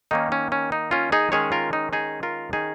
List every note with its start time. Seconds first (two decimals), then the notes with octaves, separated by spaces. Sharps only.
0.11 D#3 A#3 C#4 D#4
0.32 C#4
0.52 C#4
0.72 D#4
0.91 C#4 F4
1.12 D#4 G#4
1.32 D#3 G#3 C#4 G#4 C#5
1.52 F4 A#4
1.73 D#4
1.93 D#4 G#4
2.23 F4 A#4
2.53 D#3 C#4 D#4 G#4